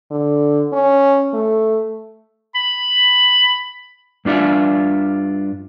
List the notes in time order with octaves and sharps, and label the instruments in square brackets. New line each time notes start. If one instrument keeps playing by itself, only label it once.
[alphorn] D3
C#4
A3
[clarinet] B5
[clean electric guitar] G2 D4 F4 E5